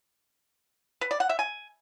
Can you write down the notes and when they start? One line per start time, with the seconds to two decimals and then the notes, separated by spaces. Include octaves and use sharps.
1.01 B4
1.11 D5
1.20 F#5
1.29 E5
1.39 G#5